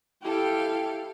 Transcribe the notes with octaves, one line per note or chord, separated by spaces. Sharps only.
E4 G4 A4 F5 G5